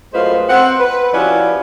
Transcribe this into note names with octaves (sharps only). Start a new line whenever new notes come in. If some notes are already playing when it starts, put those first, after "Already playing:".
F#2 A2 G#3 F4 B4 C5
C4 F#5
B4
F3 C#4 E4 F#4 G4 D5